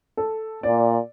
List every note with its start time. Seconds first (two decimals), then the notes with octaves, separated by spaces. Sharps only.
0.17 A4
0.63 A#2 D5